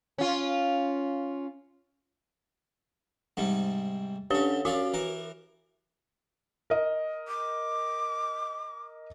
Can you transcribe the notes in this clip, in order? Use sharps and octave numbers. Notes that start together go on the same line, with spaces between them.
C#4 F4
G#2 C3 G3
D3 C#4 G4 C#5 G7
C#4 F4 F#4 D5
E3 A#4
A#4 D#5
D6